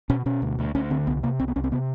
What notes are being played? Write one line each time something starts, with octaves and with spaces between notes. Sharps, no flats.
B2 C#4
B2 C#4
D2
D2
D2 C#4
D3 C4
C2 B3
C3 A#3
C2 C4
B3
C2 C#4
C4
C3 B3